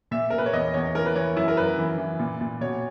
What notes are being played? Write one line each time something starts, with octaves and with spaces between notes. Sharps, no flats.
A#2 E5
A#2 A#4
B4
C#5
E2 D#5
E2 C#5
E3 A#4
B4
E3 C#5
F#2 E4
A#4
F#2 B4
E3
E3
A#2
A#2
B2 C#5